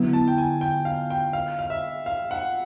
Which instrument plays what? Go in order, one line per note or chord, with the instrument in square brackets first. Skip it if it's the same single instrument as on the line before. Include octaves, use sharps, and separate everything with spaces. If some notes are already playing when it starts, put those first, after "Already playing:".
Already playing: [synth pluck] D3 F#3 B3 E4
[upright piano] A5
G5
G#5
G5
F5
G5
F5
F5
E5
F5
F#5